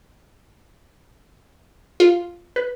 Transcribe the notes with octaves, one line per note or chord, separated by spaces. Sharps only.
F4
B4